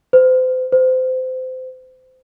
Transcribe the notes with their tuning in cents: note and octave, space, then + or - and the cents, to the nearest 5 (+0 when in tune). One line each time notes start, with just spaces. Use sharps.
C5 -35
C5 -25